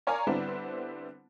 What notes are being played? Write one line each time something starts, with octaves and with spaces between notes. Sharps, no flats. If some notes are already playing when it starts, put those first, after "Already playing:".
A#4 C#5 D5 F5 G#5 A#5
D3 G3 B3 C4 D4 E4